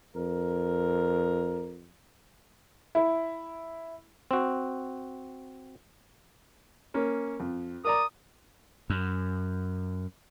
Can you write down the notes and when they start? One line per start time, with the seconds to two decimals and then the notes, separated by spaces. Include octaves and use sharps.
0.15 F2 A#4
2.95 E4
4.31 C4 F#4
6.94 A#3 C#4
7.40 F2
7.84 A#4 D5 A#5 D#6
8.90 F#2